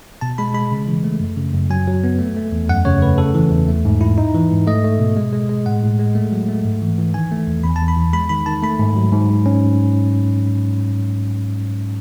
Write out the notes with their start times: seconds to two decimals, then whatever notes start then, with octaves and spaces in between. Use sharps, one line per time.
0.21 B2 A5
0.38 G#3 B5
0.54 G#3 B5
0.72 C#3
0.87 E3
1.04 A3
1.20 F#2
1.37 C#3
1.53 F#2
1.70 F#3 G#5
1.87 F#3
2.04 B3
2.19 A3
2.36 A3
2.52 E2
2.69 F#2 F#5
2.85 C#3 C#5
3.01 A3 B4
3.18 C#3 A4
3.34 E3
3.51 E2
3.69 A3
3.85 G#2
4.01 E4
4.18 D#4
4.34 E3
4.51 G#2
4.67 A3 D#5
4.84 A3
4.99 B2
5.17 G#3
5.33 G#3
5.49 G#3
5.66 A2 F#5
5.83 A2
5.99 G#3
6.15 A3
6.32 F#3
6.49 A3
6.65 G#2
6.82 E3
6.98 E3
7.14 D#3 G#5
7.31 A3
7.47 E2
7.64 E2 B5
7.76 A5
7.81 E2
7.88 B5
7.96 E3
8.13 G#3 B5
8.29 D#3 B5
8.46 D#3 A5
8.62 A3 B5
8.79 G#2
8.96 F#3
9.12 G#2
9.29 G#2
9.46 C#4